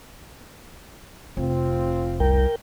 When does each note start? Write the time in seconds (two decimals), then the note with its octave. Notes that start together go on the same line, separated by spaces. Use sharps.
1.37 F1 C4 F4
2.20 C2 A#4 G5